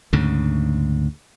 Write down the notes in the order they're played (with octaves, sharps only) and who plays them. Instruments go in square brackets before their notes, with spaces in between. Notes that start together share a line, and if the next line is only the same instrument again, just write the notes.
[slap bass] D2 G#2 C#3